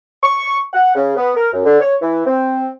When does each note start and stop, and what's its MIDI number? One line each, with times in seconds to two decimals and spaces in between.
0.22 0.57 85
0.72 0.93 78
0.94 1.16 49
1.16 1.32 59
1.35 1.48 70
1.52 1.64 42
1.64 1.80 50
1.80 1.93 73
2.01 2.25 52
2.25 2.66 60